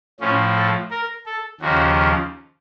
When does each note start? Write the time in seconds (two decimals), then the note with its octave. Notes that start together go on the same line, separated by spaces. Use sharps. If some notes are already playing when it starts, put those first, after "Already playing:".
0.20 A2 F3 C#4
0.56 A4
0.91 A#4
1.26 A4
1.61 D#2 C#3 F3 F#4